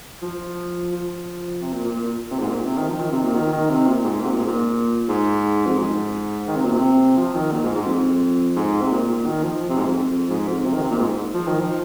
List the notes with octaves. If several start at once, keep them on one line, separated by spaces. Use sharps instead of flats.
F3
F3
C3
A#2
A#2
A#2
C3
G#2
A#2
C3
D#3
F3
D#3
C3
A#2
D#3
D#3
C3
A#2
G#2
C3
A#2
G#2
A#2
G#2
F2
G#2
D#3
C3
A#2
C3
F3
D#3
A#2
G#2
G#2
F2
G#2
C3
A#2
A#2
D#3
F3
C3
G#2
F2
G#2
F2
C3
D#3
C3
A#2
G#2
F3
D#3
F3